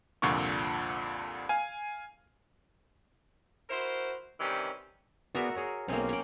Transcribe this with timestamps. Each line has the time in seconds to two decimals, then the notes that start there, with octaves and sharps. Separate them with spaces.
0.22 C2 F2 A#2 D3 C#6
1.49 F5 G#5
3.69 E4 F#4 A#4 C5
4.40 C3 D#3 E3 G3 C#4
5.35 B3 F#4 G#4 A#4 D5 E5
5.55 G#4 C#5 A#5
5.88 B1 A#3 C4 C#4 G#4
6.09 C#4 G5